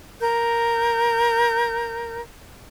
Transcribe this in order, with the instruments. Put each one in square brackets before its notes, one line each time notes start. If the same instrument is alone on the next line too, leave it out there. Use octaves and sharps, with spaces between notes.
[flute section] A#4 G6